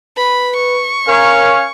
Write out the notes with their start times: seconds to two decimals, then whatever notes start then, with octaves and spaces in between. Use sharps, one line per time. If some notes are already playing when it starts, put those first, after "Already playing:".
0.17 B4 B5
0.57 C#6
1.07 C#4 A#4 C#5 F5